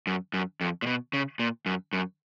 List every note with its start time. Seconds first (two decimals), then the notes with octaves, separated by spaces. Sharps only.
0.07 F#2
0.34 F#2
0.61 F2
0.82 A#2
0.87 B2
1.13 C#3
1.39 A#2
1.66 F#2
1.93 F#2